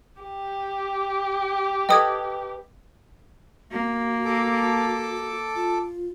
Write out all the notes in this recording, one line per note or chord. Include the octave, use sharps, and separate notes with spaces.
G4
A4 B4 D#5 G5 D#6 G#6
A#3 F#4
A4 A5 D6
F4